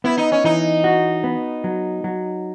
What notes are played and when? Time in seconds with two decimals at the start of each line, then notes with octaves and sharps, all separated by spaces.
0.04 B3 E4
0.17 D#4
0.32 C#4
0.44 E3 D#4
0.84 F#4
1.24 B3
1.64 F#3
2.04 F#3